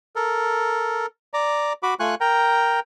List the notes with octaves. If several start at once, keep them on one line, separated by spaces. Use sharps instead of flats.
A4 A#4
D5 A#5
F#4 B5 D6
A3 F4 G#5 C#6 F#6
A#4 G5 A#5